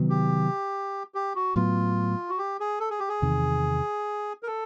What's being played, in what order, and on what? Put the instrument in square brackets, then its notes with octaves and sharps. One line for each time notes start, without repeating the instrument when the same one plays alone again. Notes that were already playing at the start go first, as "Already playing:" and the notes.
Already playing: [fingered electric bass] C3 D#3 F#3 B3
[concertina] G4
G4
F#4
[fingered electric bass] A2 F#3 B3 [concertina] F4
[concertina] F#4
G4
G#4
A4
G#4
G4
G#4
[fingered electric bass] E2 C3 D#3
[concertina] A#4
A4